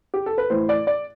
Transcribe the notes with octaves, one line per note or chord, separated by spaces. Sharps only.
G4
A4
B4
A2 E3 C5
D5
D5